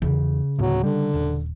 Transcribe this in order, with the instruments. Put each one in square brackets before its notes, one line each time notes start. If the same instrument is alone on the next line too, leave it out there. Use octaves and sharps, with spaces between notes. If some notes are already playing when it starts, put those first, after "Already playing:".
[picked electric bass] E2 [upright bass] C#3
[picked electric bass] D2 A2 B3 [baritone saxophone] F#3
[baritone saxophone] D3 [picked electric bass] G3
[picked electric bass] D#1